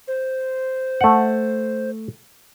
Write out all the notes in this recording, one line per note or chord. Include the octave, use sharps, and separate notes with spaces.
C5
A3 F#5